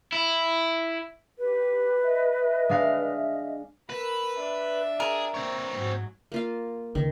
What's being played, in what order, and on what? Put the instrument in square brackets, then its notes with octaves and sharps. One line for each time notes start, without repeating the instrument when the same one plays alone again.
[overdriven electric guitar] E4
[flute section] G4 [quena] B4
[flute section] D#5 E5
[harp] G#3 D4 F5
[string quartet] A#4 B5 E6 [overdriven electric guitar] B4
[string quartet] D4 D5 E5
[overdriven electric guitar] G#4 [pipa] A#4
[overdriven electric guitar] C4 C#5
[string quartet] G#2 F#3
[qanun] A#3 F4 F5
[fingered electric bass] C#2 [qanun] D#3